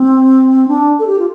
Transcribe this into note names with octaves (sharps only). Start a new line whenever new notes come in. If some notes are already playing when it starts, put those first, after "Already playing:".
Already playing: C4
D4
A4
G4
F4